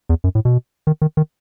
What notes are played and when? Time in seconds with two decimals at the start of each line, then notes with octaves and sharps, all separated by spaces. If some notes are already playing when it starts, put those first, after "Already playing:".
0.09 E2
0.24 F#2
0.35 A2
0.45 B2
0.87 D#3
1.02 D#3
1.17 D#3